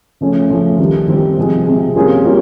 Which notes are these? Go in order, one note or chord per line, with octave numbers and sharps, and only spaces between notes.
C#3 F3 A3 C#4
C#3 F3 A3 C#4
D#3 G3 C4
D#3 G3 C4
C3 F3 G#3
C3 F3 G#3
G3 A#3 C#4 F4 G#4
G3 A#3 C#4 F4